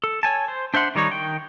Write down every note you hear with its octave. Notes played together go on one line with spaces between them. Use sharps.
A4
C#5 G#5 A5
C5
D4 C5 E5 F#5 C6
D#3 G3 D#4 C#5
D#3 G5